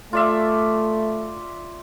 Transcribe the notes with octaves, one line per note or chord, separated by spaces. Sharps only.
A3 F4 D5 E5